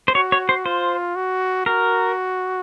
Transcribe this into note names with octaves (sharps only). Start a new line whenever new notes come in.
C5
F#4 C#5
C#5
C5
F4 C5
F#4
F#4 A#4